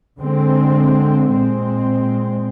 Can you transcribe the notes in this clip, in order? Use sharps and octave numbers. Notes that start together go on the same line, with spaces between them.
D3 G#3 C4
A#2 G#3 C4